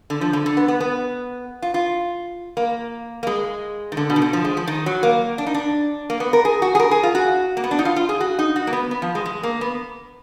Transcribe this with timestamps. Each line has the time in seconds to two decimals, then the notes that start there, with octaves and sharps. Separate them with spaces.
0.10 D3
0.21 F3
0.33 D3
0.46 D3
0.57 B3
0.68 B3
0.81 B3
1.62 F4
1.74 F4
2.57 A#3
3.23 A#3
3.27 G#3
3.92 D#3
3.97 D3
4.10 B2
4.16 D#3
4.22 D3
4.33 F3
4.45 G#3
4.57 F3
4.67 D#3
4.86 F#3
5.03 A#3
5.38 D4
5.46 D#4
5.54 D4
6.10 A#3
6.20 B3
6.33 A#4
6.45 G#4
6.62 F#4
6.75 G#4
6.80 A#4
6.91 G#4
7.03 F4
7.15 F#4
7.57 A#3
7.64 B3
7.71 D4
7.79 D#4
7.85 F4
7.96 F4
8.09 G#4
8.21 F#4
8.39 D#4
8.56 F#4
8.67 A#3
8.73 B3
8.91 B3
9.02 F3
9.15 G#3
9.26 G#3
9.43 A#3
9.61 B3